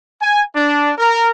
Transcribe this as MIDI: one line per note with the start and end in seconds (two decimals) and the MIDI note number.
0.21 0.43 80
0.55 0.92 62
0.98 1.30 70